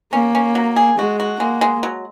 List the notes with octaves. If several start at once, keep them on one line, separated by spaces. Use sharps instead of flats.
A#3 C#4
C#4
F#3
G#4
G#3 F#4
F#4
G#3 A#3
G#3
F#3